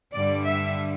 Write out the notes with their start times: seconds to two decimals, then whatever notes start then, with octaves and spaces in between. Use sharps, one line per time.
0.14 G2 D3 G3 D5
0.47 E5